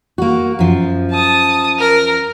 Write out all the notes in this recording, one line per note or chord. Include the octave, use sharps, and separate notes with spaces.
A#3 F#4
F#2 F3
A5 D#6
A#4